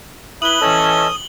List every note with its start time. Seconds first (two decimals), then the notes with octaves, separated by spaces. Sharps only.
0.42 E4 B4 D#6 F#7 G7
0.61 A2 E3 C#4 D#5 A5 E6